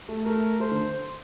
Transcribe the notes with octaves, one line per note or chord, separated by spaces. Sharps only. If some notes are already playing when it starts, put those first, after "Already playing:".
A3
A3 A#4
A3 C5
D3